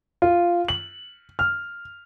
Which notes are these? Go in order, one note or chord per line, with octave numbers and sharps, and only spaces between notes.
F4
F#7
F6